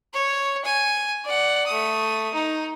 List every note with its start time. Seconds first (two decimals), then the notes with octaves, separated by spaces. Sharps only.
0.13 C#5
0.64 G#5
1.24 D5 F#5
1.66 A3 D#6
2.34 D#4